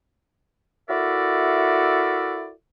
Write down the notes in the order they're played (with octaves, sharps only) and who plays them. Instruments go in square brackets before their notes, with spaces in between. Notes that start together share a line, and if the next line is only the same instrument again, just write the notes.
[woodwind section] E4 F#4 A4 A#4 D5 E5